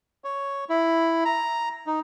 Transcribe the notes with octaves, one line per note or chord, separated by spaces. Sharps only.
C#5
E4
A#5
D#4